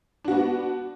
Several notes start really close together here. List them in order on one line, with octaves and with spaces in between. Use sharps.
D4 F#4 B3